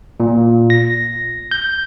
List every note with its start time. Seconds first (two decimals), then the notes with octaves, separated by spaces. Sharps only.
0.20 A#2
0.70 A#6
1.51 G6